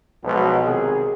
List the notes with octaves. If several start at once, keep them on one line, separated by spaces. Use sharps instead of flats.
B1 B2 F3 G#3 B3
C3 D#3 G#4